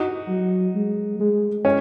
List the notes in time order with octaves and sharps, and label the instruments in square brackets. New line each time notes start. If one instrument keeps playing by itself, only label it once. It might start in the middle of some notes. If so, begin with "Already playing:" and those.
Already playing: [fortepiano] D#4 F#4
[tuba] F#3
G#3
G#3
[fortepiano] C#4